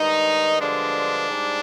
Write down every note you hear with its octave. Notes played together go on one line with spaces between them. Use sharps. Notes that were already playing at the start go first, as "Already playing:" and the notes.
Already playing: G2 D#3 G#3 D#4
G2 D3 F3 G#3 D4
G#2 G3